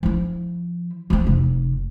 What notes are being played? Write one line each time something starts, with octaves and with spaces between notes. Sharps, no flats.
F3 E4
F3 C4
F1